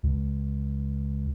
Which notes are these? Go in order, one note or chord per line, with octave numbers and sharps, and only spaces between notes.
C#2